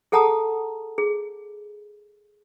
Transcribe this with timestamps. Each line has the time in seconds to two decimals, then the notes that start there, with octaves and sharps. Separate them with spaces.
0.12 G#4 A4 F#5 A5 A#5 D#6
0.98 G#4